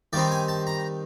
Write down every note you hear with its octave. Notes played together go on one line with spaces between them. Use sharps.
D#3 G3 C4 D#4 D5
G#5
A5
A#5